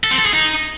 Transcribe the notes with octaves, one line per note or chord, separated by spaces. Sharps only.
A4
C4
A4
G#4
D#4